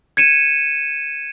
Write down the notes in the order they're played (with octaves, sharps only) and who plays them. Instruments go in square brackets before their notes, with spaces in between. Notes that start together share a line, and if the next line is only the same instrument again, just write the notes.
[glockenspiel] G#6 C#7 D#7 E7